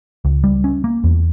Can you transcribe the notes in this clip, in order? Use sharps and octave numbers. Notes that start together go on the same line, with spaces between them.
C#2
G3
C#4
A#3
E2